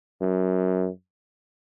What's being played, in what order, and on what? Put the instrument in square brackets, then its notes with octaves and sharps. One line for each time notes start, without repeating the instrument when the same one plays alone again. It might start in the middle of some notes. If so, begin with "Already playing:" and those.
[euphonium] F#2